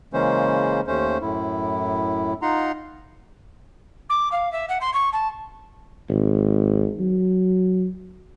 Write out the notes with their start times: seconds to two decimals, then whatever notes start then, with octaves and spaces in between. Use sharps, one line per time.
0.13 C#3 E3 G#3 A#3 C#4 C5
0.87 D#2 A3 C#4 C5
1.22 F#2 A2 E4
2.42 D#4 F4 F#5 A#5 C6
4.09 D6
4.31 F5
4.52 E5
4.69 F#5
4.80 C6
4.93 C#6
5.12 A5
6.09 G#1
6.99 F#3